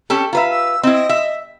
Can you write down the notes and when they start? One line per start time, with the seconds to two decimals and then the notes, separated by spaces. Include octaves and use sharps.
0.10 C#4 G4 A4
0.33 F4 B4 E5 A#5
0.50 E6
0.83 C4 E4 D#5
1.09 E5